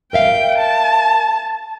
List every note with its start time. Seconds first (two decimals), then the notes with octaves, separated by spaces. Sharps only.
0.13 A#4 E5 F5 G5
0.58 A5